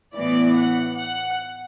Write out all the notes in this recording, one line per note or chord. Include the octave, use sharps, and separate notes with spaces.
A2 E3 B3 D5
F#5
F#5